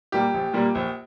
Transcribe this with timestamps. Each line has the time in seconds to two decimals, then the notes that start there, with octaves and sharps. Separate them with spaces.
0.12 A#2 G3 A#3 G4
0.34 A#1
0.53 A#2 G3 A#3
0.75 A#1